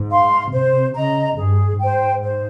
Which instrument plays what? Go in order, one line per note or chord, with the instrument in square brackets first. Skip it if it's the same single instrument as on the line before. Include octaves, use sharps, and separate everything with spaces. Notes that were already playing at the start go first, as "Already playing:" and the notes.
Already playing: [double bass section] G#2
[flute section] F5 C6
[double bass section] C3 [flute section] C5
[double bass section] C#3 [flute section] D#5 A#5
[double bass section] G2 [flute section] G#4
[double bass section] G#2 [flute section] C5 G5
[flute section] C5